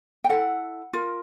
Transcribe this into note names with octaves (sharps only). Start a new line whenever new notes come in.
G5
E4 A4 F#5
F4 A#4